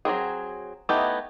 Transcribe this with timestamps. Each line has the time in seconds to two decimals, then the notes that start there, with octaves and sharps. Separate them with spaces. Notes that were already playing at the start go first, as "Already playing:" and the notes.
0.05 F#3 G3 C4 G#4
0.89 A3 B3 D#4 E4 G4